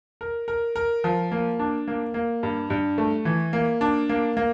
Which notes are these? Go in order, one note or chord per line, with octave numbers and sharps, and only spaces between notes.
A#4
A#4
A#4
F3
A#3
D4
A#3
A#3
G2
G2
A3
E3
A#3
D4
A#3
A#3